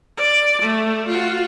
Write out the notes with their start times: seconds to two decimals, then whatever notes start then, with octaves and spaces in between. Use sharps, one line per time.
0.17 D5
0.62 A3
1.07 F4 F#4